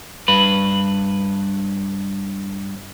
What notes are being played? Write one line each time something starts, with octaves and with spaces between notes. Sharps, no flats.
G2 B4